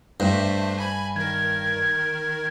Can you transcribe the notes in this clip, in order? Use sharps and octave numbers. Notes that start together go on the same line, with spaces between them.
G2 A3 D4 C5
G#5 B5 G#6
D#3 A#4 G#6